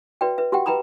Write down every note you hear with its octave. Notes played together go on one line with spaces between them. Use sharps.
F#4 B4 D5 E5 G5
B4 E5
F#4 G4 E5 F#5 G5
B4 E5 G5 A#5 B5 D#6